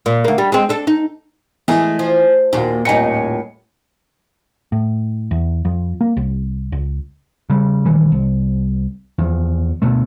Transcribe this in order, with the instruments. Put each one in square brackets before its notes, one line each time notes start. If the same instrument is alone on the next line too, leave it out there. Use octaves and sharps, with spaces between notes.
[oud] A#2
D2 A#3
G3
G#3 C4
D4 A4
D#4
[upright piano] E3 G#5 [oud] G#3 A3
[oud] F3
[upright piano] D#2 F#4 [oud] A#2
[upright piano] D#1 G#5 C#7 [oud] A2 D#4
[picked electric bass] A2
E2
F2
A#3
C2
C#2
[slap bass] C#3 G3
A#1 D#3 E3 G3
C2
E2 F3
D2 B2 A3